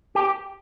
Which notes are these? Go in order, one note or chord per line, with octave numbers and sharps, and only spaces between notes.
G4